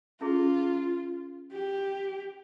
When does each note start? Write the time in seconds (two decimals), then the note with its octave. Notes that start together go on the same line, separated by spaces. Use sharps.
0.21 C#4 E4 F4 G#4
1.53 G4